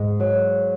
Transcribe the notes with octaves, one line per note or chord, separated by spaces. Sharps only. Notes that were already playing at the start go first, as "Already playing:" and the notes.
Already playing: G#2 G#3
F#3